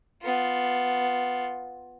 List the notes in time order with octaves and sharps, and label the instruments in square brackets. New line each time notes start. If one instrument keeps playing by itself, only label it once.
[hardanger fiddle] B3 F4